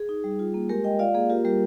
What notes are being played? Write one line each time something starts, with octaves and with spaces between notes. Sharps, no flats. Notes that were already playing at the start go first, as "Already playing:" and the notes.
Already playing: G#4
D#4
G3
F4
A#3
G#3 G4 A#4
G#3 D#5 G5
F4 D5 F5
A#3 G#4
F4 G4 A#4
G3 G4 A#4